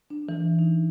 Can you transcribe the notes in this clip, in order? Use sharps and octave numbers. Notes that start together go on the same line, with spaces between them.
D4
E3
D#4